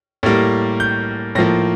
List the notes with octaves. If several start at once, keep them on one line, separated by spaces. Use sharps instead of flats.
A2 G3 A#3
G6
A2 F3 A#3 A#6